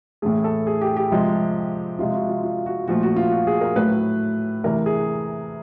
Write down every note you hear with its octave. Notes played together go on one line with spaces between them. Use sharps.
A2 E3 A3 G#4
A4
G#4
G4
G4
C3 F3 G#3
C3 F3 G#3 F4
F#4
F4
F4
F#4
A#2 F3 A3 F#4
F#4
F4
F#4
G#4
A#4
A2 F#3 A3 B4
C3 E3 A3 A#4
G#4